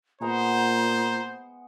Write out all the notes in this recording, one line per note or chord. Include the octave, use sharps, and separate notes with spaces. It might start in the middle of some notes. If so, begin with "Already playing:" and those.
A#2 G#3 B3 C5 F#5 A#5